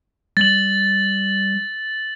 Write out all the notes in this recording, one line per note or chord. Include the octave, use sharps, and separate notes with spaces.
G3 A6 F#7